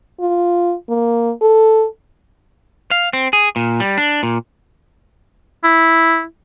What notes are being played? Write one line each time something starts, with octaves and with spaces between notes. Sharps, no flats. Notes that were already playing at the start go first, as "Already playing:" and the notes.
F4
A#3
A4
F5
C4
G#4
A#2
G3
D4
A#2
E4